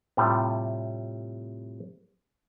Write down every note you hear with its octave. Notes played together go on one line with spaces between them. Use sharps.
A2 C3 G3 A3 F4